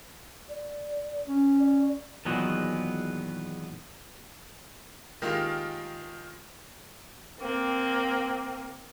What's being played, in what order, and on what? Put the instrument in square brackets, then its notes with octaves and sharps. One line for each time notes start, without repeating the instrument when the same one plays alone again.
[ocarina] D5
[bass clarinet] C#4
[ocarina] D5
[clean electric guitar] E2 A#2 D#3 F#3 G#3 B3
[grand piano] D#3 G#3 A#3 F4 G4
[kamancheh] A#3 C4